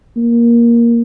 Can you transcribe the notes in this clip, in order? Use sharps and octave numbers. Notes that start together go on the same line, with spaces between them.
A#3